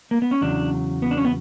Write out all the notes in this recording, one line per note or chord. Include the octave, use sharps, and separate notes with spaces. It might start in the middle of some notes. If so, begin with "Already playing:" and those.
A#3
B3
C#4
E2 C#3 F#3 D4
B3
D4
C#4
B3